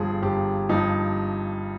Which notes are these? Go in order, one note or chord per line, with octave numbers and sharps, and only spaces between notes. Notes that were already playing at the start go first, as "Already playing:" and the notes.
Already playing: G1 G2 F3 G#4
G1 G4
G2 F3 D#4